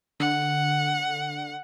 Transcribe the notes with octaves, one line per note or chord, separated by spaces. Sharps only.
D3 F#5